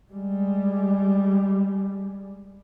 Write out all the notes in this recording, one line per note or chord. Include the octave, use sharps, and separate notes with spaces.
G3 G#3